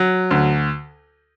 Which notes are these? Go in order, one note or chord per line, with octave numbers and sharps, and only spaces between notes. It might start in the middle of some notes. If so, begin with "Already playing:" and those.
Already playing: F#3
D2